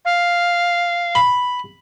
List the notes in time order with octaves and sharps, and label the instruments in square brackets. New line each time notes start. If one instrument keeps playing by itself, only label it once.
[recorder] F5
[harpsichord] B5